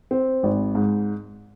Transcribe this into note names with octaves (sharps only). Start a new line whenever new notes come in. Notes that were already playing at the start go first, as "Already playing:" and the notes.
C4
G#1
G#2